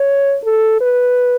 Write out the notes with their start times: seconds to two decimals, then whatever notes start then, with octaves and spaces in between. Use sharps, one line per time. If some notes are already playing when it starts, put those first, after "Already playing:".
Already playing: C#5
0.44 A4
0.81 B4